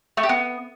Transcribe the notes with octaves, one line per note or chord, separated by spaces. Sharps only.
A3
G4
B3